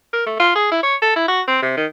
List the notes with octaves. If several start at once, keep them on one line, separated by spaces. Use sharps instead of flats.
A#4
A3
F4
G#4
E4
C#5
A4
E4
F#4
C4
C3
D#3